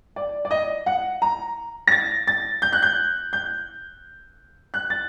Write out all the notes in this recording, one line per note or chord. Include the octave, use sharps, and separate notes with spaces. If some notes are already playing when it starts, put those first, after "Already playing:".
D5
D5
D#5
F#5
A#5
A#6
A6
A6
G6
F#6
G6
G6
F#6
A6